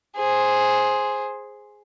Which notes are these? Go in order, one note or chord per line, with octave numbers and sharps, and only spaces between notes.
G#4 C5